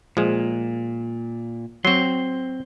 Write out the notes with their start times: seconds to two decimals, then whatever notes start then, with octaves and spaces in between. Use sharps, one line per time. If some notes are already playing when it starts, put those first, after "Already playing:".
0.17 A#2 F3 G#3
1.85 F#3 C4 F#4 C6